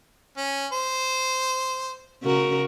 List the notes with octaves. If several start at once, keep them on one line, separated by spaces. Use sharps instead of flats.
C#4
C5
C#3 F#4 A#4